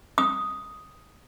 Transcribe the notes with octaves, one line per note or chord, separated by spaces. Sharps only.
D#6